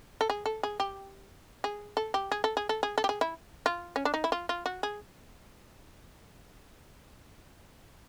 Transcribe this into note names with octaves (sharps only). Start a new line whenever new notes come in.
A4
G#4
A4
G#4
G4
G#4
A4
G4
G#4
A4
G#4
A4
G#4
A4
G4
G#4
E4
F4
C#4
D4
D#4
E4
F4
F4
F#4
G#4